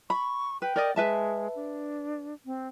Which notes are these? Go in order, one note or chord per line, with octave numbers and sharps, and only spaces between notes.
B5 C#6
B4 G5
A#4 D5 D#5
G#3 B4 E5 A5
D4
C4